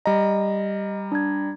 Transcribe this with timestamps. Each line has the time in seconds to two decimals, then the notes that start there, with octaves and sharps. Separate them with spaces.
0.06 G3 D#5 A#5
1.12 D4 G#6